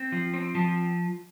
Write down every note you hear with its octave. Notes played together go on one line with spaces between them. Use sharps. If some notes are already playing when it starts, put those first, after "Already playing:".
Already playing: C4
F3
C4
F3